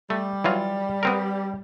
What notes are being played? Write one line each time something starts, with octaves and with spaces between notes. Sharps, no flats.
G3 A3
E3 F#3 F4
B3 C4 A#4